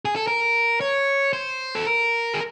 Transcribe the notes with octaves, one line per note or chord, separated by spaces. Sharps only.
G#4
A4
A#4
C#5
C5
A4
A#4
G#4